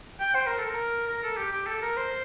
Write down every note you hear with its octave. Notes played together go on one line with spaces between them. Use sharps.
G5
C5
A#4
A4
A#4
A#4
A4
G4
G4
A4
A#4
C5